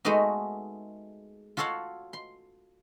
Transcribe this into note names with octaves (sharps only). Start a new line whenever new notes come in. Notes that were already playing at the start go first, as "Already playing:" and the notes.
G#3 A3 B3 D#4 F#4
F4 F#4 A4 C#5 F5 F#5
C6